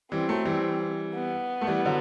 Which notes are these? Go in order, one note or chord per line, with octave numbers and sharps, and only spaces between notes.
E3 G3 C4
F#3 A3
E3 G3
B3
A3
E3 G3
D3 F#3